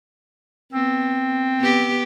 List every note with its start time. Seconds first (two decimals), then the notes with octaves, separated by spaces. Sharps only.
0.73 B3 C4
1.59 B3 G4